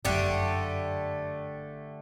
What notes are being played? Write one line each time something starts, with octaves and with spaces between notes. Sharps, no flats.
G1 F#2 D3 A3 G4